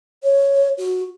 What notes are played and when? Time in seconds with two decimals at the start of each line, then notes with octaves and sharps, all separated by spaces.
0.23 C#5
0.78 F#4